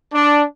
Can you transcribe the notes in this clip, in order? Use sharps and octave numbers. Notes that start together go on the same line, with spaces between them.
D4